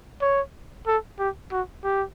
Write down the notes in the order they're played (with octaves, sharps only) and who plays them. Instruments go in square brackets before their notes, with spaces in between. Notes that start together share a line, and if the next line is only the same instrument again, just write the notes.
[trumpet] C#5
A4
G4
F#4
G4